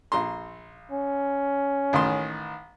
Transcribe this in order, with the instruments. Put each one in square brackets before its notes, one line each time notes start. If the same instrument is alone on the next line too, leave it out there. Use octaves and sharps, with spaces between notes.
[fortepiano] A#1 A#5 C6
[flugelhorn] C#4
[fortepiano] A1 D#3 C6